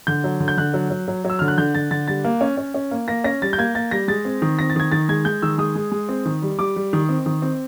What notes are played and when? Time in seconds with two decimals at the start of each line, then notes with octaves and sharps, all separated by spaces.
0.07 D3 G6
0.24 F#3
0.40 D3
0.48 G6
0.57 D3 F#6
0.74 F#3
0.90 F#3
1.08 F#3
1.25 F#3
1.30 E6
1.39 D3 F6
1.48 F#6
1.58 D3 G6
1.75 D3 A6
1.91 D3 A6
2.07 G3 A6
2.24 A#3
2.41 C#4
2.57 C#4
2.74 C#4
2.91 A#3
3.08 A#3 A#6
3.24 C#4 A#6
3.42 G3 A6
3.53 G6
3.58 A#3 G#6
3.75 A#3 A6
3.91 G3 A#6
4.08 G#3 A6
4.25 C4
4.42 D#3
4.59 C4 A#6
4.70 A6
4.76 D#3 G#6
4.92 D#3 A6
5.09 G#3 G#6
5.25 G#3 G6
5.42 D#3 E6
5.58 G#3 D#6
5.75 G#3
5.92 G#3
6.09 C4
6.25 D#3
6.42 G3
6.59 G3 D6
6.76 G3
6.93 D#3
7.09 C4
7.26 D#3
7.42 C4